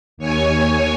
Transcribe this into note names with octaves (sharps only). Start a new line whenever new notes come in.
D#2 C#5 G#5